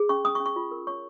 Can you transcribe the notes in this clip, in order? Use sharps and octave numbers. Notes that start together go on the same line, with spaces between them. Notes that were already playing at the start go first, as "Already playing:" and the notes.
Already playing: G#4
C#4 C#6
C#4 D#6
C#6
C#4
C#6
F4
A#4
C#5 C#6